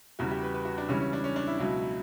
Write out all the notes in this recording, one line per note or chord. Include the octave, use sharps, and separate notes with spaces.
E2 C#3 E3 G3 F#4
G4
B4
B4
F#4
D4
C#2 C#3 E3 G3 C#4
C#4
D4
C#4
D4
E4
C#2 B2 F#3 E4